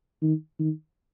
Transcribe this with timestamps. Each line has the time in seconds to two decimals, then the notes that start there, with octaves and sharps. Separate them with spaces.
0.22 D#3
0.59 D#3